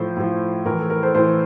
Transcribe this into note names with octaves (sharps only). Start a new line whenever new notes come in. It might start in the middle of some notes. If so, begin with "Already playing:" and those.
Already playing: A2 F3 A4 C5
A2 F3
A2 E3 A#4
A4
A#4
A4 C5
A2 E3 A4 C5